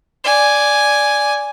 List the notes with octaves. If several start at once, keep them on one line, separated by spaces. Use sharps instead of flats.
D5 G#5